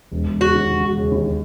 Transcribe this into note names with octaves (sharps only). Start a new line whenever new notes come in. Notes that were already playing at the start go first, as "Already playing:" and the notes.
E1
E1
C#3 F#4
D#2
E1
E1
C#3
D#2